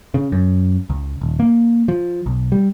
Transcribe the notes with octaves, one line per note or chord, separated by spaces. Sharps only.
C#3
F#2
C#2
D#1
A#3
F3
B1
G3